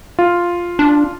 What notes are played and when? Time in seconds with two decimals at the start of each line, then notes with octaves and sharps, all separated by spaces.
0.19 F4
0.79 D4